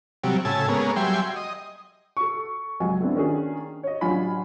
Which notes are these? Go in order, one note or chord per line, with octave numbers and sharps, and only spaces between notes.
C3 F#3 G3
A2 C#3 G#5 A5 E6
G#3 A#3 B3 C#4
F#3 G3 E5 G5 G#5 C6
D#5
A4 C#6
C#2 F#3 D#5 G#5
A3 B3 C4 D4 E4
D#3 A#3 C#4 D4 G#4
C#5 D#5
A1 F#3 D4 F4 G#5 B5